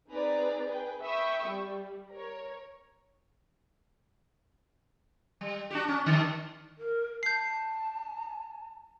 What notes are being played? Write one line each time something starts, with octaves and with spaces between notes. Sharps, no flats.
C4 D#4 G#4 B4 D5 A#5
G#4 B4 G5
E5 G5 B5 C#6 D#6 E6
G3
A#4 C#5
G3
D4 F#4 G4
C#4
G2 D3 D#3
A#4
A5 G6 C7